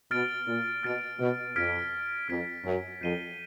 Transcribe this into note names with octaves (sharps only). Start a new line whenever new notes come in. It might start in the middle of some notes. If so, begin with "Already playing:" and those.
B2 F6 A6 D7
A#2
B2 F6 A6 D7
B2
F2 F6 G#6 B6 D7
F2 F6 G#6 B6 D7
F#2
F2 G6 C7 D#7 G7